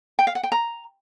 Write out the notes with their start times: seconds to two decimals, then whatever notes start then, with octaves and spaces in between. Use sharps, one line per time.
0.19 G5
0.27 F5
0.35 F#5
0.43 G5
0.52 A#5